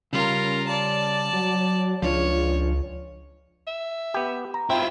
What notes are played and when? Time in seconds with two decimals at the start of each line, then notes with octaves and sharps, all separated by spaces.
0.13 C#3 G3 C#4 F4 A#4
0.67 D5 A5
1.33 F#3
2.02 C#2 F3 D4 F4 C#5
3.67 E5
4.14 B3 G4
4.54 A#5
4.70 C4 E4 F4 G5